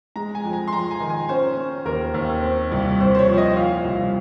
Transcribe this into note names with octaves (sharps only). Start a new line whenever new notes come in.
G#3 A#5
G#5
F2
A#5
C6
F2 A#5
G#5
D#3
G#5
C#4 C5
C#4
D#2 A#4
D#2
C4
C2
C2 C5
C5
C#5
F3
D#5
A#2 F5
C2